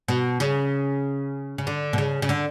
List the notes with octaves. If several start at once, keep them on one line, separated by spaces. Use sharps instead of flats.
B2
C#3
C#3
D3
B2
C#3
C#3
D3